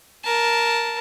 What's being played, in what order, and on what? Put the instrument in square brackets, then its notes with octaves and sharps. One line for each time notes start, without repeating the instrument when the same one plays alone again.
[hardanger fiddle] A#4 A5